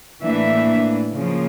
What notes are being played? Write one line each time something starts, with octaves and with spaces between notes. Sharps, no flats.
A2 E3 A#3 D4 E5
C#3 F3 A#3